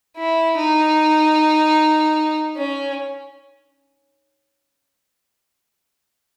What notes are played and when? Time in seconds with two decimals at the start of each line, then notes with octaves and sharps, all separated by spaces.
0.17 E4
0.57 D#4
2.57 C#4